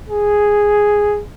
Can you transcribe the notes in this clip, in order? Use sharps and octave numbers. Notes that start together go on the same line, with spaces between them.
G#4